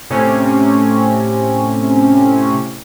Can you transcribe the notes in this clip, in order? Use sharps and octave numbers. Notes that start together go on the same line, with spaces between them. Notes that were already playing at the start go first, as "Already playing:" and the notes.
A2 C3 C#4